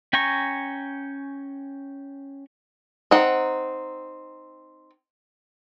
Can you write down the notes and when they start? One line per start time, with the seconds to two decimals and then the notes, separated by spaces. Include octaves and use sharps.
0.13 C#4 G5 G#5 A#5 C#6
3.11 C4 D#4 F#5